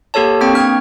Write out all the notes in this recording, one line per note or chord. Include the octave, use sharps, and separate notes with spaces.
A#3 G4 A4 C#5 A5
A#3 C4 G5 C#6
D4 F6 G#6